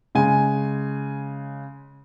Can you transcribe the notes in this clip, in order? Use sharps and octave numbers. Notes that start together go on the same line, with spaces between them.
C#3 G#3 G#5